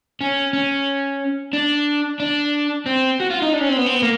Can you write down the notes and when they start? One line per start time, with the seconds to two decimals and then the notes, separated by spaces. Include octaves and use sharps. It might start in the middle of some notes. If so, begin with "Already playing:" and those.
0.21 C#4
0.53 C#4
1.53 D4
2.20 D4
2.86 C4
3.20 F#4
3.30 F4
3.42 D#4
3.53 D4
3.61 C#4
3.69 C4
3.77 B3
3.86 C4
3.94 B3
4.02 A#3